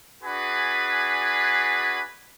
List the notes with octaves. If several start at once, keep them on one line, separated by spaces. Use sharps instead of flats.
D4 F#4 G#4 B4 G#5 B5